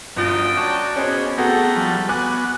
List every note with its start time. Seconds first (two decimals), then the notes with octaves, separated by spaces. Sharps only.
0.16 G1 F#2 F4 D#5 G5 A6
0.57 F#4 C#5 D5 A5
0.96 B2 C#4 G#4 C5
1.38 A3 B3 F#4 G#4 A4 G5 A#5
1.76 F3 G3
2.09 B3 F#4 F#5 G#5 D6 F#6